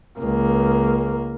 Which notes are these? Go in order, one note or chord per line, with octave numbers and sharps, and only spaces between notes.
C#2 A#3